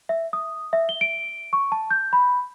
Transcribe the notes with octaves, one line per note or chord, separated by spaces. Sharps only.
E5
D#6
E5
G7
D7
C#6
A5
G6
B5